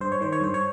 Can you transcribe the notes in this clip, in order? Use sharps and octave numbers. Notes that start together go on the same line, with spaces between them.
G2 C5
C#5
D#3 C5
C#5
G2 C5
C#5